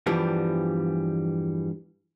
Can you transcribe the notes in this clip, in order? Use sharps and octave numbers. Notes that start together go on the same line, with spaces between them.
E2 G2 E3 F3 G3 B3